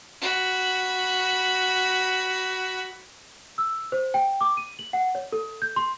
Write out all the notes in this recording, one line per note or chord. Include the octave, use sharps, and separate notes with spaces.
F#4 B5
E6
C5
G5
D6
D#7
F#7
F#5
C#5
A4
G6
C6